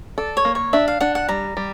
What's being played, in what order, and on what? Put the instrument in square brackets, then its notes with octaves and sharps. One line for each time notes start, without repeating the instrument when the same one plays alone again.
[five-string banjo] A4 [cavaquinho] D5
[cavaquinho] C#5
[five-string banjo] A#3
[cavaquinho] C#5
[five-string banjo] D4 [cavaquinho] E5
[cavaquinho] F5
[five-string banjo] D4 [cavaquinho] F#5
[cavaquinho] F#5
[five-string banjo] G3 [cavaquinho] A#5
[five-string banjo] G3